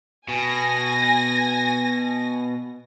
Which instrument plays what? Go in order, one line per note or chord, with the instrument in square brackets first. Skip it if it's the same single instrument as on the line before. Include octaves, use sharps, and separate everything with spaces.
[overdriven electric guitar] B2 [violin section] G#5 A#6